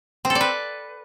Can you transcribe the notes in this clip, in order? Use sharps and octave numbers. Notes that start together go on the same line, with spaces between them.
C4
A4
D5
B4